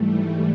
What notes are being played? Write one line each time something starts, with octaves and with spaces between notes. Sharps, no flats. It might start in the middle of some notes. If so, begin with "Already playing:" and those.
Already playing: G#2 E3 G3 A3